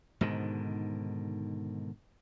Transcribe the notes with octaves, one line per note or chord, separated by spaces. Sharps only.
G#2 B2 D3 D#3